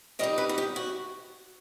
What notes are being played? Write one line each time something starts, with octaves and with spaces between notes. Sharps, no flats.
D#3 G3 D#4 D#5
B4
F#4
G4
F#4